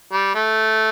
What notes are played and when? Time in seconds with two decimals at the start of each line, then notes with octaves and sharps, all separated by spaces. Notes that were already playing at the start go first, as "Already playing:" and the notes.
0.12 G3
0.35 A3